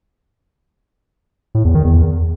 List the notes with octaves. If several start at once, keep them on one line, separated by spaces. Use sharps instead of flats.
A2
E2
D#3
E2